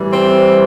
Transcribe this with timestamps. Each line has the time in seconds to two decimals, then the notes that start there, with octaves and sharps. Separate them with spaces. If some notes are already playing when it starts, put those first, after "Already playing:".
Already playing: A2 E3 G3
0.13 C4